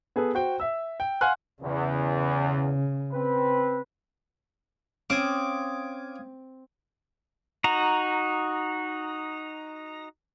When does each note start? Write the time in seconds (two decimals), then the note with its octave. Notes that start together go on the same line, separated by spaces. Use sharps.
0.16 B3 G#4 A4 B4
0.35 F#4 C5 G5
0.60 E5 E6
1.00 G5
1.21 F5 F#5 G#5 C6 F6 F#6
1.62 E2 C#3
3.12 C4 B4
5.10 C4 C#4 F5 D6 D#6 G#6
7.64 D#4 F#4 A#5